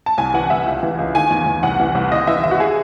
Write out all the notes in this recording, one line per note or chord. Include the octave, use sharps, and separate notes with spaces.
A5
C2 G#5
E3 F#5
C2 E5
C#2
E3
C#2
D#3 G#5
E2
E2
C2 F#5
E3
C2
D#2 D#5
E3 E5
D#2 E5
F#4
G#4